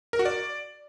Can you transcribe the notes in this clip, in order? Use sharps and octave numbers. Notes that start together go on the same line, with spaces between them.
A#4
F#4
D5